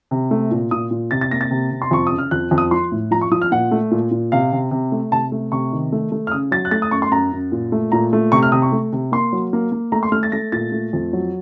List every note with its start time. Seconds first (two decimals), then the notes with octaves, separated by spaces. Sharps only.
0.11 C3
0.31 A3
0.51 A#2
0.71 A#2 D#6
0.91 A#2
1.11 C3 A6
1.21 A6
1.31 A#3 A#6
1.41 A6
1.51 C3
1.71 C3
1.82 C6
1.91 F2 C#6
2.07 C#3 D#6
2.18 F6
2.31 F2 F#6
2.51 F2
2.58 D#6
2.71 F3 C6
2.92 A2
3.11 F3 A#5
3.22 C#6
3.31 F3 D#6
3.42 F6
3.52 A#2 F#5
3.71 A3
3.91 A#2
4.11 A#2
4.32 C3 F5
4.52 C3
4.71 C3
4.92 A3
5.11 C3 A5
5.32 A3
5.52 C3 C#6
5.72 D#3
5.92 A3
6.12 A3
6.27 F6
6.31 C#3 D#6
6.51 F#3 A6
6.65 F#6
6.71 A3 A6
6.82 D#6
6.91 F#2 C#6
7.02 C6
7.11 F#2 A#5
7.32 F#2
7.52 A#2
7.72 A3
7.92 A#2 A#5
8.13 A3
8.32 C3 C#6
8.43 F6
8.52 C3 D#6
8.62 C#6
8.72 A3
8.92 C3
9.12 A#3 C6
9.32 F#3
9.53 A#3
9.72 A#3
9.92 A3 A#5
10.03 C6
10.12 A3 F6
10.23 A6
10.32 A3 A#6
10.52 A#2 A6
10.72 A3
10.93 F2
11.13 F#3